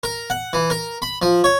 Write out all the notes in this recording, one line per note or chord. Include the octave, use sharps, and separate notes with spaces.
A#4
F#5
E3
A#4
B5
F3
C#5